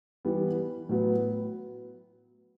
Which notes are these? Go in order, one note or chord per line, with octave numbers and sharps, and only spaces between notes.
E3 G3 B3
A2 F#3 B3